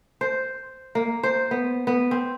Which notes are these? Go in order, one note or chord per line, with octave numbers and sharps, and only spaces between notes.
C5
A#3
C5
B3
B3
C4